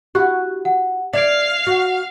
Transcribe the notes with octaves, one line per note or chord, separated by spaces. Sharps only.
E4 F#4 G4 F#6
F#5
D5 E5 F5 G#6 D7
F#4